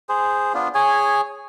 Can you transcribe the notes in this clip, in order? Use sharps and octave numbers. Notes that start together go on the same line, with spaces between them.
G#4 C5
B3 D4 F4
G#4 C#5 G#5